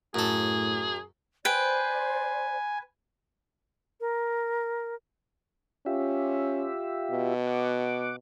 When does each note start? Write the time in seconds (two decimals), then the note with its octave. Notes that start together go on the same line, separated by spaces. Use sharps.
0.15 F#2 A2 G#4 A4
1.45 B4 C5 D5 G5 G#5
4.00 A#4
5.86 C#4 F4 G4 E5
7.11 B2
7.47 F#5 D6